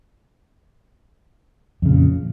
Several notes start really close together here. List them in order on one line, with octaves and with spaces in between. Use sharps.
F2 C#3 A#2